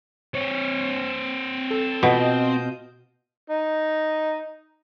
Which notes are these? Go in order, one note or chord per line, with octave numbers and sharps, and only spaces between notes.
C4 C#5
A4
B2 F4 D#5 G6
D#4